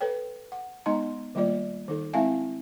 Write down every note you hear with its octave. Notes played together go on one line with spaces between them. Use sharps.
A4 B4 C#5 G5
F#5
G#3 B3 D#4 D#5 A#5 C6
D#3 G3 A#3 F4 D5
D#3 D#4 A4
G#3 C4 E4 E5 F5 G#5